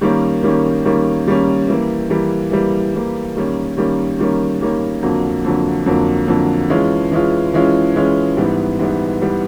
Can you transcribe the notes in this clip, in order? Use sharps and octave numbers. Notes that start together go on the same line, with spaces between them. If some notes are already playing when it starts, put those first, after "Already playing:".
D#3 G3 A#3 C#4
D#3 G3 A#3 C#4
D#3 G3 A#3 C#4
D#3 G3 A#3 C#4
E3 G3 A#3
E3 G3 A#3
E3 G3 A#3
E3 G3 A#3
D#3 G3 A#3 C#4
D#3 G3 A#3 C#4
D#3 G3 A#3 C#4
D#3 G3 A#3 C#4
F2 D3 F#3 A#3
F2 D3 F#3 A#3
F2 D3 F#3 A#3
F2 D3 F#3 A#3
E3 G#3 C#4 F4
E3 G#3 C#4 F4
E3 G#3 C#4 F4
E3 G#3 C#4 F4
G#2 E3 G3 B3
G#2 E3 G3 B3
E3 G3 B3